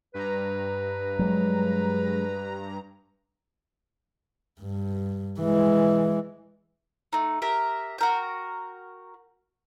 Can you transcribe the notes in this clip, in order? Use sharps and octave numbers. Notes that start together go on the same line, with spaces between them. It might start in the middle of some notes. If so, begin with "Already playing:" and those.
G2 B4 A#5
F#3 G#3
G2
E3 G#3
A3 D#4
G4 A#4 E5
F#4 A#4 G5